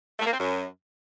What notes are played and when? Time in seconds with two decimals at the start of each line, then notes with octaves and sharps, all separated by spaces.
0.19 A3
0.26 A#3
0.33 C4
0.40 F#2